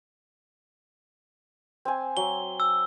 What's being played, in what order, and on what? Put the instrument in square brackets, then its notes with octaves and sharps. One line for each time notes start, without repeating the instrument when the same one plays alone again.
[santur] C4 G#5
[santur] F#3 [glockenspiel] G7
[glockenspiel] E6